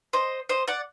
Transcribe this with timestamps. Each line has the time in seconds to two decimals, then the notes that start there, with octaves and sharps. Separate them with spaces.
0.13 C5 D#5
0.49 C5 D#5
0.68 D5 F#5